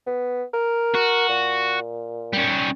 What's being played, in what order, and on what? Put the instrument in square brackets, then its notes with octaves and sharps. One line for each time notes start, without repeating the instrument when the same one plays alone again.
[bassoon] B3
A#4
[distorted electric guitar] F#4
[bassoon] A#2
[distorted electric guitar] G3 C#4